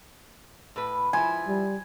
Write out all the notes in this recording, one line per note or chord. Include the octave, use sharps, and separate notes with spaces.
A2 B4
F3 E4 G#5
G3